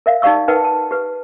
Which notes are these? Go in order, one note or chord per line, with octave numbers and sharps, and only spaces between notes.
A#4 E5 F5
D#4 G4 D5 F5 C#6 E6
D#4 A#4 B4 F#5 G5 A5
A5
G4 B4